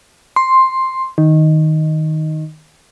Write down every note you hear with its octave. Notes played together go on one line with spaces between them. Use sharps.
C6
D#3